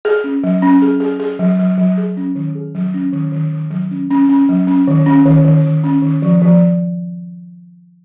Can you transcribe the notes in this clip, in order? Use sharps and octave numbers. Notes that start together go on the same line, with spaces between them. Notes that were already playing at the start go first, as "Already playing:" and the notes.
G#4
C#4
F#3
C#4
G#4
G#4
G#4
F#3
F#3
F#3
G#4
C#4
D#3
G#4
F#3
C#4
D#3
D#3
D#3
F#3
C#4
C#4
C#4
F#3
C#4
D#3
C#4
D#3
D#3
D#3
C#4
D#3
F3
F3